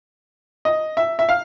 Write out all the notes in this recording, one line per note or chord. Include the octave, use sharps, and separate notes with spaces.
D#5
E5
E5
F5